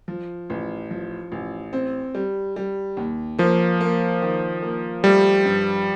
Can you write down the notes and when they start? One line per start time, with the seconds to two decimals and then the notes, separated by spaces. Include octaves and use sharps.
0.08 F3
0.50 A1
0.91 F3
1.32 A1
1.73 C4
2.15 G3
2.56 G3
2.97 D#2
3.38 F3 A#3
3.81 A#3
4.22 D#3
4.62 A#3
5.04 G3 A3
5.45 G2